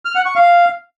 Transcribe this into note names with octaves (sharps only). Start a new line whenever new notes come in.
F6
F#5
C#6
F5